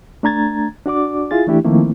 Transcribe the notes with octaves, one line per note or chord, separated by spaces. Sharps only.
A3 D4 A#5 G#6 A6
D4 F#4 D5 D6
E4 F4 G#4 A6
E3 A3 D4 E4 G4
D#3 F3 A3 A#3 C4 E4